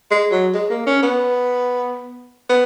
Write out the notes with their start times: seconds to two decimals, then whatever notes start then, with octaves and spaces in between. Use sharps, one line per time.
0.11 G#3
0.32 F#3
0.54 G#3
0.70 A#3
0.87 C#4
1.03 B3
2.49 B3